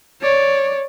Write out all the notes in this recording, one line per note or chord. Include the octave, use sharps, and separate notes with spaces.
C#5 D5